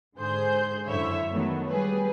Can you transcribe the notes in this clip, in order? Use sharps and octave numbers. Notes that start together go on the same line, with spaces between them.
G#2 D3 G#4 C5 G6
F#2 D3 E4 C#5 E5
D#3 F#3 A3 B3
G3 G#4 B4